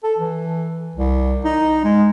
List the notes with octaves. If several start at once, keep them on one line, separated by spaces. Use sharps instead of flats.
A4
E3
C2
D#4
G#3